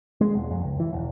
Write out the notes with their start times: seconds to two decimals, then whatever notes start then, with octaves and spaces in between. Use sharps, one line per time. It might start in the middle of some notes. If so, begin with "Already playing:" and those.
0.21 G#3
0.35 E1
0.51 F2
0.64 C#2
0.80 E3
0.93 E1